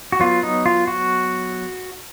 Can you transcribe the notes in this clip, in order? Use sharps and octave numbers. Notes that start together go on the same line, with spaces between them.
F#4
F#3 B3 F4
D#4
F4
F#4